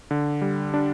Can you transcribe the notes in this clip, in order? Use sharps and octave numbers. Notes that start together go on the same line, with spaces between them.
D3
G3
D4